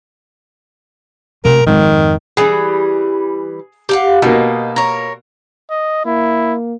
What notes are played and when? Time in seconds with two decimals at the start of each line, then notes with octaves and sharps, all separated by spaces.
1.45 C3 A3 A#4
1.67 F2 G#2 D#3
2.37 E3 G3 G#4
3.89 G4 F5 F#5
4.22 B2 A#3 D#4
4.76 A#4 C#5
5.71 D#5
6.06 A#3 E4